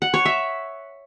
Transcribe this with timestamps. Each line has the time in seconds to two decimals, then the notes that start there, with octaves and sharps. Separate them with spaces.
0.02 F#5
0.14 C#5
0.25 E5